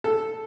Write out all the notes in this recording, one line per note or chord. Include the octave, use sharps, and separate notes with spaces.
A4